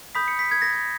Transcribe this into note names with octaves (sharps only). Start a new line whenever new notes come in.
B5 D#6 G6 B6
C#7
B6
G#6
A#6
G#6